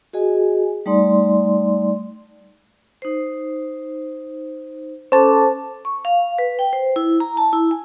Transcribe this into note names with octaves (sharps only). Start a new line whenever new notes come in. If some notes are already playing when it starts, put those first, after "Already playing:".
F#4 G#4 D#5 G#5
G3 A3 D#4 D5 C6
D#4 C5
C#4 A4 C5 A5 D6
C#6
F5
B4
G5
C5
E4
A#5
A5
E4
G#5